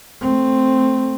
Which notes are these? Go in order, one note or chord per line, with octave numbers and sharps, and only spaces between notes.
A3 C4